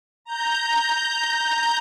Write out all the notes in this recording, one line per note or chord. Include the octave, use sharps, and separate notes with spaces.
A#5 G6